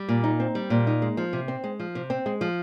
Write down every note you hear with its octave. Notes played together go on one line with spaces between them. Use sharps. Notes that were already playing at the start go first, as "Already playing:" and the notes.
Already playing: G3
A#2
D#4
C4
G3
A#2
D#4
G#3
F3
C3
C4
G#3
F3
C3
C4
G#3
F3